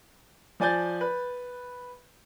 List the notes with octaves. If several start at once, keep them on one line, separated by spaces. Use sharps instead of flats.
F3 D5 G#5 G6 A6
B4